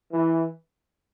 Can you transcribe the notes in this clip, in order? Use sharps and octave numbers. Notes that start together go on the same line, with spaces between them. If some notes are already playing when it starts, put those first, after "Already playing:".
E3